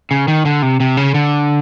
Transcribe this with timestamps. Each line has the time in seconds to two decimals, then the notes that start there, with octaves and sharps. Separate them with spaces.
0.11 C#3
0.28 D#3
0.45 D3
0.62 C3
0.80 C3
0.97 C#3
1.14 D3